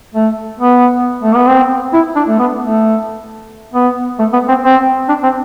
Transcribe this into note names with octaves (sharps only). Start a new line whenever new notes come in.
A3
B3
A3
B3
C4
E4
D4
A3
B3
A3
B3
A3
B3
C4
C4
D4
C4